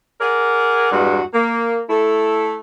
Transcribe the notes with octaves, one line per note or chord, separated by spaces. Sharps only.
G#4 A#4 D5 F#5
E2 G2 G#3 F#4
A#3
A3 E4 A4